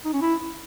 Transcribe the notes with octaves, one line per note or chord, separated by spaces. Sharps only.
D#4
C#4
E4